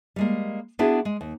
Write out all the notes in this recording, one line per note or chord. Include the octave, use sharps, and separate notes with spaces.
G3 G#3 A#3
B3 D4 E4 F#4 G#4
G#3
D#2